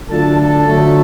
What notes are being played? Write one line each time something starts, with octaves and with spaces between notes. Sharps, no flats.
D3 F#3 A3 D4 F4 A4 A5
A4 A5
D3 F#3 A3